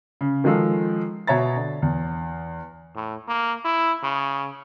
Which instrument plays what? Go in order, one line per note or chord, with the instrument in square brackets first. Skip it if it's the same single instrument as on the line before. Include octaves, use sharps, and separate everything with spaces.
[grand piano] C#3
D#3 F3 G#3 F4 A4
B2 C#5 E5 A#5 A6
D3
E2
[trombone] A2
A#3
E4
C#3